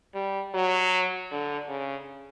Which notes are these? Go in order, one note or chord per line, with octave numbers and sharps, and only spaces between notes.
G3
F#3
D3
C#3